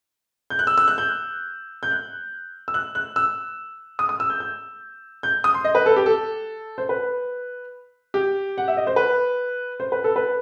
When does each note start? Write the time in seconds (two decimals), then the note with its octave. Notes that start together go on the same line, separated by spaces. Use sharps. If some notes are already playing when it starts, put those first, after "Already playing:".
0.50 G6
0.59 F#6
0.67 E6
0.78 E6
0.88 F#6
0.98 G6
1.83 G6
1.91 F#6
2.68 E6
2.74 F#6
2.95 F#6
3.16 E6
3.99 D#6
4.09 D#6
4.20 E6
4.30 G6
4.40 G6
5.23 G6
5.44 D#6
5.54 C6
5.65 D#5
5.75 B4
5.86 A4
5.96 G4
6.06 A4
6.78 C5
6.89 B4
8.14 G4
8.58 F#5
8.68 E5
8.77 D#5
8.87 C5
8.96 B4
9.80 C5
9.92 B4
10.04 A4
10.16 B4